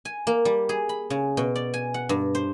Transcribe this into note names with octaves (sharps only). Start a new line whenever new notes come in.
G#5
A#3
G3
G#4
B5
C#3
B2
D5
G#5
F#5
G2
C5